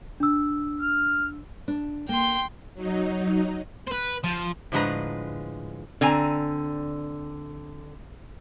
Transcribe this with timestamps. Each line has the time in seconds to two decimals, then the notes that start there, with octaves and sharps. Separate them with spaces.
0.20 D4 E6
0.81 F6
1.68 D4
2.09 A#3 G5 C6
2.74 F#3 D#4
3.88 B4 C5
4.24 F3
4.72 A2 D3 F3 G#3 B4 A#5
6.01 D3 C4 G#5 A#5